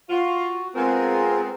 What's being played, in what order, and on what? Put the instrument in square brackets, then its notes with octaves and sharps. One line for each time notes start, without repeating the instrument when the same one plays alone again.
[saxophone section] F4 [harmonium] F#4
[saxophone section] G#3 B3 C4 [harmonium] F4 G#4 A#4